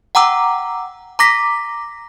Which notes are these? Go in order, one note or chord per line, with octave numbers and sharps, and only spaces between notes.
F#5 G5 A#5 D6 E6
A#5 D6 A#6 B6